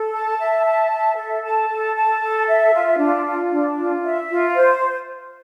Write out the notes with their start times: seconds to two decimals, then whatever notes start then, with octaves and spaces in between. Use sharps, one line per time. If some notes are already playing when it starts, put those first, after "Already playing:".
Already playing: A4
0.13 A5
0.39 E5
0.65 A5
0.91 E5
1.17 A4
1.43 A5
1.69 A4
1.95 A5
2.21 A4
2.47 E5
2.74 F4
2.99 D4
3.25 F4
3.51 D4
3.78 F4
4.04 E5
4.29 F4
4.55 C5